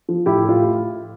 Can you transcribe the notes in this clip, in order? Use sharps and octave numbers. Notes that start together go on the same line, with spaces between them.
F3
A2 E4 G4
A2
F4